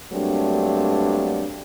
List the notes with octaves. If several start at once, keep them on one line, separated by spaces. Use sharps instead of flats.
G2 F#3 A3 A#3 C4 D4